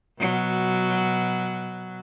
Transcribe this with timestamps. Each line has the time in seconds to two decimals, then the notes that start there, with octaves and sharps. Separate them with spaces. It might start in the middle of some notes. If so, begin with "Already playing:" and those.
0.20 B2 F#3